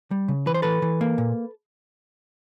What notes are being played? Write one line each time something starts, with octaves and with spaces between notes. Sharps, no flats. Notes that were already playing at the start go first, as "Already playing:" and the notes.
G3
C#3
E3 B4
C5
E3 A4 B4
E3
A#3
A#2